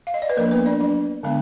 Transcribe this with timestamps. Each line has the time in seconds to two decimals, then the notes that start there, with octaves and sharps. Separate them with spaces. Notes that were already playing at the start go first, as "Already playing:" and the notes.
0.07 F5
0.14 D#5
0.22 D5
0.30 B4
0.37 F3 A#3 D4 A#4
0.51 B3 B4
0.66 D4 D5
0.80 F#3 D4
1.23 D3 G#3 B3 D4